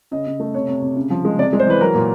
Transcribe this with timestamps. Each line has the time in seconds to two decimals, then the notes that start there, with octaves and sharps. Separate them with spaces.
0.11 C#3 D#5
0.26 C#3
0.40 A3
0.54 C3 C#5
0.68 C3
0.82 C3
0.96 C#3
1.10 F3
1.25 G#3
1.38 C3 D5
1.53 G#3
1.59 C5
1.67 E3 B4
1.81 F#3 A#4
1.94 A#2